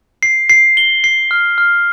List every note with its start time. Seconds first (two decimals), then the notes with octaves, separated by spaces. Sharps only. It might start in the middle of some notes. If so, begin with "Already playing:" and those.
0.23 C7
0.50 C7
0.77 G7
1.04 C7
1.31 F6
1.58 F6